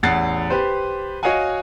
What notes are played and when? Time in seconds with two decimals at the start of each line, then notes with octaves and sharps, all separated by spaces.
0.03 A1 E2 F#5 A6 C7
0.50 G4 B4 C5
1.23 F#4 C#5 D#5 F5 F#5 G#5